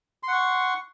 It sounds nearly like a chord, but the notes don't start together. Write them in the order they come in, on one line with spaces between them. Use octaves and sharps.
C6 F#5 C#6